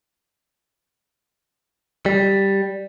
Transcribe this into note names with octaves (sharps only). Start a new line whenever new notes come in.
G3